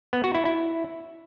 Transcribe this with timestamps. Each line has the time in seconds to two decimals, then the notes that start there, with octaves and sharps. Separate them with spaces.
0.13 B3
0.24 F#4
0.35 E4
0.45 E4